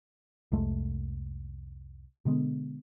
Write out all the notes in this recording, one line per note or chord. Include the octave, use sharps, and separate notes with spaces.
C2 F2 G#3 A3
B2 D3 G#3 B3